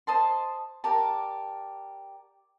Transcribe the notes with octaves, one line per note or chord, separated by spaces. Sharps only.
C5 D#5 A5 C6
G4 A#4 D5 A5